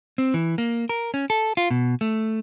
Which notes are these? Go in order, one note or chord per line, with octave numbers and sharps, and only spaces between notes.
C4
E3
A#3
A#4
C#4
A4
F4
B2
A3